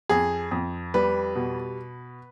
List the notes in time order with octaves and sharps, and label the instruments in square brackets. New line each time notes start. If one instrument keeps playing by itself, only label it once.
[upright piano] F2 G#4
F2
G3 B4
B2